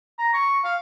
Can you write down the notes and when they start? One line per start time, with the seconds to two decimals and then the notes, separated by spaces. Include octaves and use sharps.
0.19 A#5
0.33 C#6
0.64 F5